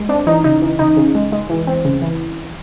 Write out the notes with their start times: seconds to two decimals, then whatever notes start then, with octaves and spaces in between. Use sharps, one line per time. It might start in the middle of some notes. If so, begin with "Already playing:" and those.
Already playing: G#3
0.09 C4 D4
0.27 E3 D#4
0.44 C#3 D#4
0.62 E3
0.79 C#3 D#4
0.97 C#3
1.15 G#3
1.32 G#3
1.50 E3
1.67 C4
1.85 C#3
2.02 E3